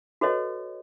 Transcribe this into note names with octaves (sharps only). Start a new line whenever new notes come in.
F#4 A4 B4 C#5 D#5